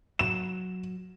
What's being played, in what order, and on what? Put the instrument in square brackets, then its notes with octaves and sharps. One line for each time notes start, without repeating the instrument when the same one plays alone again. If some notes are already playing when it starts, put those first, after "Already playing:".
[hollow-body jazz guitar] F#3 F#4 [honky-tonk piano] E7